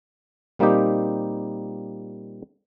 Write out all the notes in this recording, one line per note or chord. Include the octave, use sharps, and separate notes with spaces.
A#2 G3 A#3 C4 D#4 G4